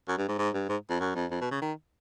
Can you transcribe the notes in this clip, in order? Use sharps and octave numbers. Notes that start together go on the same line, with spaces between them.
F#2
G2
G#2
G#2
G2
G#2
F2
F#2
F2
F2
B2
C#3
D#3